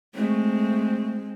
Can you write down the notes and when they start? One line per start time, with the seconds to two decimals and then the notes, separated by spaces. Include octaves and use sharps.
0.15 G#3 A3 C4